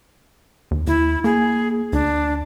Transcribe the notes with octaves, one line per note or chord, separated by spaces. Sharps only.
D#2
D#2 E4
A#3 G#4
D2 D4